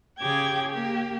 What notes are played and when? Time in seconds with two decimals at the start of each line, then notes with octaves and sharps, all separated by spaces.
0.20 C#3 G4 G#4 G5 D6 G#6
0.68 A#3 G4